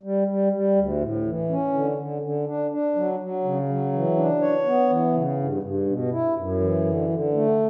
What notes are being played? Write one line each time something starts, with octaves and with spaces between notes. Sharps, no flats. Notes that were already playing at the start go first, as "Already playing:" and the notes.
G3
G3
G3
D2
A2
E3
C#4
D3
D3
D3
D4
D4
F#3
F#3
C#3
F#3
E3
D4
C#5
B3
E3
C#3
G2
G2
B2
E4
F#2
E3
D3
D3
A3